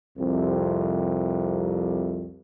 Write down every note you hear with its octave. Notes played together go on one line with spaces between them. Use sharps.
C2 F2 C3